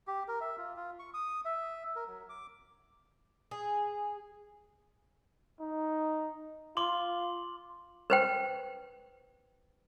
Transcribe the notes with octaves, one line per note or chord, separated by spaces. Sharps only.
G4
A#4
E5
F4
F4
C#6
D#6
E5
A#4
F#3
D6
G#4
D#4
F4 C6 D6 F#7
B4 C5 G5